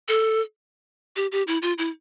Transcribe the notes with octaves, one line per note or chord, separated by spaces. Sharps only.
A4
G4
G4
E4
F4
E4